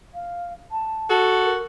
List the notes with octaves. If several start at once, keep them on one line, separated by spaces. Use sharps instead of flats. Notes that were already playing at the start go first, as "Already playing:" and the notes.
F5
A5
F#4 A4
A#4